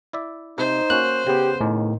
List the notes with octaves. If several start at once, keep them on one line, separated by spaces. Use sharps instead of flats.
E4 D5 E5
C3 D#4 C5
A#3 C#4 F#4 F#6
C#3 B3 G4
A2 D#3